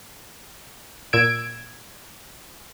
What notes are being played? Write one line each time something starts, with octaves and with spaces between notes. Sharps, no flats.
A#2 E6 G#6 D7